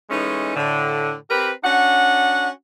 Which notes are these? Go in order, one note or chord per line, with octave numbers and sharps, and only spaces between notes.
E3 G#3 A3 C#4 D#4
A2 D3
C4 G4 A#4 B4
C#4 D4 F#4 F#5